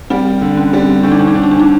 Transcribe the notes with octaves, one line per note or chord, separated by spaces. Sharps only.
G3 C4
D3
C#4
G3
D3 D4
D#4
D4
D#4
D3 D4
D#4
D4
D#4